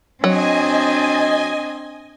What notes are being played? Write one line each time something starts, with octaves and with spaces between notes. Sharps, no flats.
F#3 C4 D4 D#5 G#5